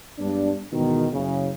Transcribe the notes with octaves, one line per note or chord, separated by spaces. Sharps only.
G2 G#3 B3 D4
E2 G#2 B2 D#3
F#1 C#3